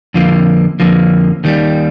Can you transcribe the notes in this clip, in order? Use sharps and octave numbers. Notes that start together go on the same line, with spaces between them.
F2 D3 F3 A#3 F4
F2 D3 F3 A#3
D#2 D#3 G3